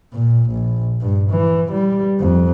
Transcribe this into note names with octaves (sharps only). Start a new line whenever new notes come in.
A#2
A#1
G2
E3
G3
F2